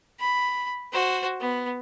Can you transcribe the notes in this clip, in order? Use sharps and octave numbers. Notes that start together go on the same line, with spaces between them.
B5
F#4 C5
B3